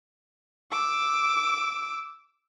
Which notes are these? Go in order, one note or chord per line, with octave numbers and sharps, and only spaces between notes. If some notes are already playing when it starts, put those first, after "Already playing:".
D6 E6